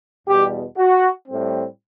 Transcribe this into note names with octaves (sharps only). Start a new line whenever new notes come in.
E2 B2 G3 G4
F#4
A2 G3 C4